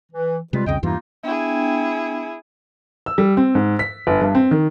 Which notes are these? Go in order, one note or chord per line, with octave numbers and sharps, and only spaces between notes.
E3
C3 G3 G#3 F4 B4
C2 F2 C#3 D#5 G5
E2 G2 E3 A#3 D#4 F4
B3 D4 E4 G#4 G5
E6
G3
C4
G#2
B6
G1
G2
C4
D#3